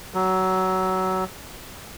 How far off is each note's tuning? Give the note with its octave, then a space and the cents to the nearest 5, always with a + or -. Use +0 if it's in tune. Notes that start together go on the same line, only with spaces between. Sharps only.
F#3 +20